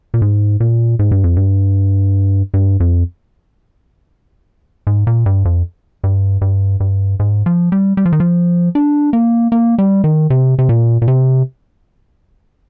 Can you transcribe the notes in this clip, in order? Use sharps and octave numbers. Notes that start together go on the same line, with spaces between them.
A#2
G#2
A#2
G#2
G2
F2
G2
G2
F2
G#2
A#2
G2
F2
G2
G2
G2
G#2
F3
G3
G3
F3
D#3
F3
D4
A#3
A#3
G3
D#3
C3
C3
A#2
A#2
C3